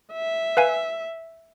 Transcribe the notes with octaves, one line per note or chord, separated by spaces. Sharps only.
E5
B4 F5 G#5